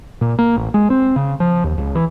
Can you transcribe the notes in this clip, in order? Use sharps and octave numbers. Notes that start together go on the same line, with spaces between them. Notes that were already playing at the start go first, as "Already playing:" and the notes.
A#2
A#3
A1
G#3
C4
C#3
F3
D#2
C#2
E3